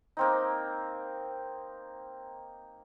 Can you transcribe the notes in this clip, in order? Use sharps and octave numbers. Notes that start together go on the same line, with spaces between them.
A#3 C4 D#4